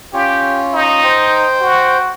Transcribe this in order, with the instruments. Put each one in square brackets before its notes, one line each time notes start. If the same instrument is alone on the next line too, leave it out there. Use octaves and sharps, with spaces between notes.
[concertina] C#4 F4 C#5 [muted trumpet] G4
[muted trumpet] D#4
[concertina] C5 G5
[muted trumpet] F#4